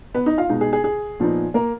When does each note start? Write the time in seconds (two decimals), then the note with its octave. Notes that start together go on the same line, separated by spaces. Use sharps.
0.14 B3 B4
0.26 D#4 D#5
0.38 F4 F5
0.49 B2 G#3 D#4
0.61 G#4
0.73 G#4
0.84 G#4
1.20 A#2 F3 B3 D#4
1.54 A#3 A#4